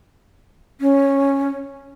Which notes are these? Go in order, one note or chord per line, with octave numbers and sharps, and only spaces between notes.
C#4